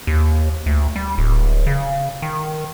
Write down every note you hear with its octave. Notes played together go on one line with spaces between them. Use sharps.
D#2
D2
G3
D1
C#3
D#3